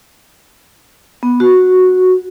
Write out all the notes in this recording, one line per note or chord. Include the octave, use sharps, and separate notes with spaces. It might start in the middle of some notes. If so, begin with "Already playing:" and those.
B3
F#4